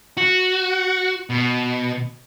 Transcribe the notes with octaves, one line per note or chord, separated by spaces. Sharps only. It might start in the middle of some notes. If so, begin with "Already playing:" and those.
F#4
B2